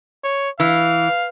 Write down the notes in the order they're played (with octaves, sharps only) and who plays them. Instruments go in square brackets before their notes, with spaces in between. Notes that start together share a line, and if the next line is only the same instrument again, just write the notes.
[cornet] C#5
[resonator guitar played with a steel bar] E3 [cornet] F5